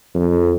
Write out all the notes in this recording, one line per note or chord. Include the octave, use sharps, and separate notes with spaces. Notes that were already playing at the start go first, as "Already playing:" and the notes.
F2